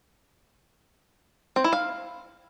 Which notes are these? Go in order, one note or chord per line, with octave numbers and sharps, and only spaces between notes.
C4
E4
F5